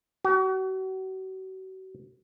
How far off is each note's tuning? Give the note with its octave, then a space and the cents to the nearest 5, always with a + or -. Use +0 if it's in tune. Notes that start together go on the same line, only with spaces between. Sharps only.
F#4 +35